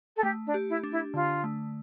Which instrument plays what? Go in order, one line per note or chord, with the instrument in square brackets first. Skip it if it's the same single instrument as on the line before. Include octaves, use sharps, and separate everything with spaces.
[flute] A4
[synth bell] A3 [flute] G4
[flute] D4
[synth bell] G4
[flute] E4
[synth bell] D4
[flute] E4
[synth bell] D3 [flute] F4
[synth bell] A3